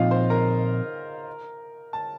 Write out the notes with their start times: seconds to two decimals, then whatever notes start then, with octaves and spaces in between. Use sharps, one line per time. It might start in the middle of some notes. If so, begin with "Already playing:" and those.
Already playing: A#2 F3 C4 D#4 F4 D#5 F5
0.11 C5 C6
0.30 A#4 A#5
1.93 A5